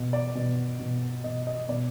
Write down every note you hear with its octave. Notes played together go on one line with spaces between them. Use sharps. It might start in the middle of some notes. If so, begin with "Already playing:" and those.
Already playing: B2
D5
B2
B2
B2 D#5
D#5
B2 D5